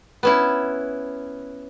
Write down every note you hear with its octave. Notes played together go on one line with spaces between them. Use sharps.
B3 C#4 E4